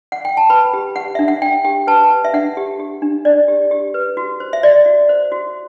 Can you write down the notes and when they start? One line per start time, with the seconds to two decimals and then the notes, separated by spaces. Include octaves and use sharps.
0.12 F#5
0.25 G5
0.37 A5
0.50 B4 B5
0.73 G4
0.96 G4 F#5
1.15 D4 E5
1.28 F#5
1.42 D4 G5
1.65 G4 G5
1.87 B4 A5
2.10 B4
2.25 E5
2.33 D4 F#5
2.57 G4
2.79 G4
3.02 D4
3.25 D4 D5
3.48 G4
3.71 G4
3.94 B4
4.17 F#4
4.40 C5
4.53 E5
4.63 F#4 D5
4.86 F#4
5.09 C5
5.32 F#4